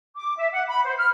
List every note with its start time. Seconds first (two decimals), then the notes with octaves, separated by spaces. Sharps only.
0.16 D6
0.38 E5
0.52 F#5
0.68 B5
0.85 C5
0.97 F6